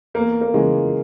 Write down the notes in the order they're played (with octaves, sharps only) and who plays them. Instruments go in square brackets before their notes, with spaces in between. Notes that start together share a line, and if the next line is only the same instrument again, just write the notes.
[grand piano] E2 [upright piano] A#3
[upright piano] A#3
[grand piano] C#3 E3 G#3